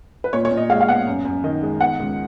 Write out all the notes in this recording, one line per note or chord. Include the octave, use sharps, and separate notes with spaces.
B4
A#2 C#5
C#5
A#2
D#5
G#3 F5
F5
B3 F#5
F#2
F#2
D#3 D#5
G#3
B3 F#5
C#2